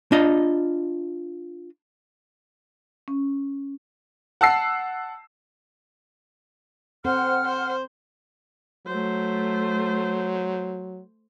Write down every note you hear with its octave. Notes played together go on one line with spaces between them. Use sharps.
D4 F4 D#5
C#4
F#5 A5 E6 C7
C4 A4 C5 F#5 F6
C5
F#3 A3 C5